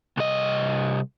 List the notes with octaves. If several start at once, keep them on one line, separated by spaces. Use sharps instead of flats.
C2 D#5